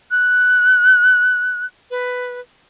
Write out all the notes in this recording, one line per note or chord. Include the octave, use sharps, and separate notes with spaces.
F#6
B4